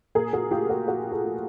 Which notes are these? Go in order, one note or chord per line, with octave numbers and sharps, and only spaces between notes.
A#2 G#4 A#4
F#4 G#4
A3 F4 G4
F#4 G#4
A#2 F#4 G#4
G4 A4
A3